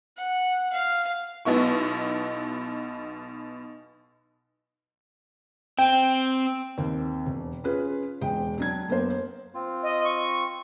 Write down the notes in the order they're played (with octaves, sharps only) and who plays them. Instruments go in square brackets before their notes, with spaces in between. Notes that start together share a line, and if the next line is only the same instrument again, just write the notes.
[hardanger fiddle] F#5
F5
[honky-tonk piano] B1 B2 B3 E4 C#6
[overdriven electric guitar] C4 [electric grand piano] G5
[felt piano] D#2 C4
E1
C#4 F4 G#4 B4
E1 G#3 G5
F#3 D4 G#6
F#2 A#3 B3 C5
[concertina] C4 F4
[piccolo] D#5
C#6